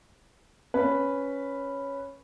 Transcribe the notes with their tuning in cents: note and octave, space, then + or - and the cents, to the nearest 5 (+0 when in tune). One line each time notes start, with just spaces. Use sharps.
C#4 +0 B4 +0